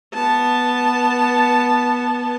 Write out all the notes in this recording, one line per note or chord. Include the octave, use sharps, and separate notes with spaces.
B3 A5